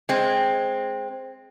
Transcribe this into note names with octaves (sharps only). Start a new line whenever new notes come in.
G#3 C4